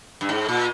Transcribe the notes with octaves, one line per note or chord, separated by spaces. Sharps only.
G2
G#2
A#2